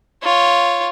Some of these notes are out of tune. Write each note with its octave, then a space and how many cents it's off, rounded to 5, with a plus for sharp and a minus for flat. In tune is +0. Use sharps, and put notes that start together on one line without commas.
F4 +0 C#5 +0